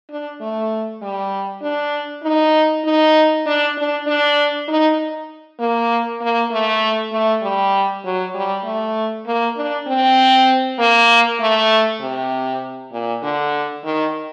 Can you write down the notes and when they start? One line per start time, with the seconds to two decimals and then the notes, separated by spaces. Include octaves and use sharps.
0.10 D4
0.41 A3
1.02 G3
1.63 D4
2.24 D#4
2.85 D#4
3.46 D4
3.77 D4
4.07 D4
4.68 D#4
5.60 A#3
6.21 A#3
6.51 A3
7.13 A3
7.42 G3
8.05 F#3
8.35 G3
8.65 A3
9.27 A#3
9.57 D4
9.87 C4
10.79 A#3
11.41 A3
12.02 C3
12.92 A#2
13.23 D3
13.84 D#3